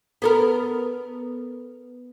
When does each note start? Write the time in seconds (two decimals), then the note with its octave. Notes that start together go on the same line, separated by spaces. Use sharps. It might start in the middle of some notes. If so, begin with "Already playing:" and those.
0.22 B3 A4 A#4